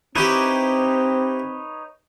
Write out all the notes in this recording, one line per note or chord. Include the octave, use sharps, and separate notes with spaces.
C4 D#4 E4 G4 B4 C#5